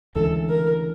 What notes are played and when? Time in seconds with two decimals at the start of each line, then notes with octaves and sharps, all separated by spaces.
0.15 D2 C#3 E3 G#3 A4
0.49 A#4